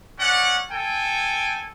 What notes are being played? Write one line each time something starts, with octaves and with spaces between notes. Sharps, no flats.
C#4 D5 F#5
A4 G5 G#5